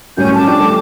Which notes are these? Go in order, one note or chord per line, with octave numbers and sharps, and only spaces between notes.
F#2 A2 G3 C#4 G#5 G6
A5 D6
F3 D4 G4
G3 A3 A4